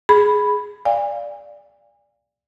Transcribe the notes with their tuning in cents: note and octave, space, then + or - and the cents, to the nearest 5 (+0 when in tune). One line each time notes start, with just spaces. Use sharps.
G#4 +5 B5 +0
D5 +0 F5 +0 G#5 -35